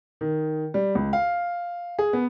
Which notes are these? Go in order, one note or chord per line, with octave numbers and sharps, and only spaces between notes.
D#3
G3
C#2
F5
G#4
B3